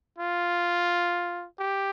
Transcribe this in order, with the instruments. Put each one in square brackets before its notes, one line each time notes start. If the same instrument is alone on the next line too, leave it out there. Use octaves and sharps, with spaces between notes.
[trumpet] F4
G4